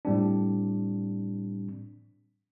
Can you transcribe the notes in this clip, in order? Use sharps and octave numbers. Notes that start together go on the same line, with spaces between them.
A2 G3 C4 D4